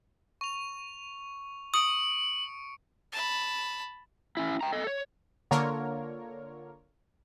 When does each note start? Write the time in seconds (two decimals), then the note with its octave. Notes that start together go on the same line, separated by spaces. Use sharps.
0.41 C#6 F7
1.74 C#6 D#6 C#7 D7 F#7
3.12 A5 B5
4.37 C#4 E4
4.61 G5 A#5
4.73 A4 D#5
4.87 C#5
5.51 D3 A#3 F4 A#4 C#5